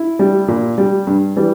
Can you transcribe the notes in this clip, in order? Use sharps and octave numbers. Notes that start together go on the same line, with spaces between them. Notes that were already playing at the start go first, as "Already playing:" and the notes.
Already playing: E4
G3
A#2
G3
G2
E3 G3